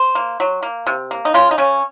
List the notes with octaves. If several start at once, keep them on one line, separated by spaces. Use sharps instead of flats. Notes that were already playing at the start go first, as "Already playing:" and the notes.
Already playing: C5
A#3
F#3
A#3
C3
A#3
D#4
C#3 F4
D#4
C#3 C#4